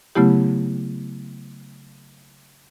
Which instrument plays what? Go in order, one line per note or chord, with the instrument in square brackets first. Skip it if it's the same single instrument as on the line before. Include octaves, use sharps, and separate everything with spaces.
[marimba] C#3 F#3 A3 B3 E4 G4